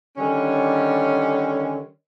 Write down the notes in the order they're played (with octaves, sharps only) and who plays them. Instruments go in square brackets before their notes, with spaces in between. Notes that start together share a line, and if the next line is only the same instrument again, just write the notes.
[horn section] D3 D#3 G3 C#4